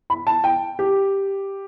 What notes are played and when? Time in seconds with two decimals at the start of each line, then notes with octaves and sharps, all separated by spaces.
0.10 B5
0.27 A5
0.44 G5
0.79 G4